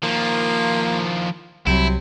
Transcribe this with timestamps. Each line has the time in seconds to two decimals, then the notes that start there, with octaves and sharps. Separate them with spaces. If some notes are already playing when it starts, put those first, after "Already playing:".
0.03 D#3 F3 A#3
1.67 C2 C3 F#3 E4